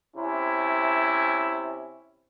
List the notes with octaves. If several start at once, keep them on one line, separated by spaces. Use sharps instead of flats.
C3 C#4 E4